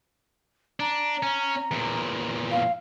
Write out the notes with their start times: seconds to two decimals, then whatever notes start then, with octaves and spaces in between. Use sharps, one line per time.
0.80 D4 A#5
1.23 C#4
1.71 E2 A#2
2.51 F5